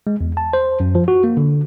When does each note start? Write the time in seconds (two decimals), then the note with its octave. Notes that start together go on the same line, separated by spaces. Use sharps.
0.07 G#3
0.21 E2
0.37 A5
0.53 C5
0.80 F#2
0.95 F3
1.08 F#4
1.24 A#3
1.37 D3